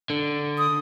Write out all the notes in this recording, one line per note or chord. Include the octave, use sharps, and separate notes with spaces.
D3
D#6